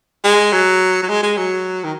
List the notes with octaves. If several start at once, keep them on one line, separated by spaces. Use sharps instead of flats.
G#3
F#3
F#3
G#3
G#3
F#3
D#3